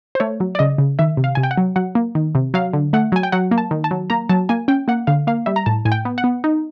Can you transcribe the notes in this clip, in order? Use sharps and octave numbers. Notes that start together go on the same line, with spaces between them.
C5
A3 C#5
F#3
D5
C#3 D#5
C#3
D#3 E5
C3
F5
C3 G#5
G5
F#5
F#3
F#3 F#5
A#3
D#3
C3
F#3 F5
D3
A3 F#5
F#3 G#5
G5
F#3 F#5
A#3
A5
D#3
A5
F#3
A#3 A#5
F#3 A5
A#3 G#5
C#4 G5
A#3 F#5
D3 F5
A#3 F5
G3 E5
A#5
A2 A5
A2 G#5
G5
B3
F#5
B3
D#4